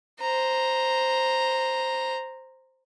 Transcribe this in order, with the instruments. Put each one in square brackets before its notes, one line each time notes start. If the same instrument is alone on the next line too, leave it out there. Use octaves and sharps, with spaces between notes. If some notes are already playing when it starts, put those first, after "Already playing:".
[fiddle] C5 A#5